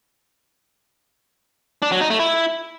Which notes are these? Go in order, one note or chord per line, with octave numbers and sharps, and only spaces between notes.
D4
F#3
D#4
A3
E4